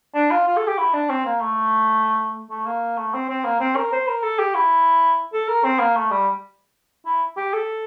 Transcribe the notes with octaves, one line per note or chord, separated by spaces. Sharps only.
D4
F4
F4
A4
G4
E4
D4
C4
A#3
A3
A3
A#3
A3
C4
C4
A#3
C4
A#4
C5
A#4
A4
G4
E4
A4
A#4
C4
A#3
A3
G3
E4
G4
A4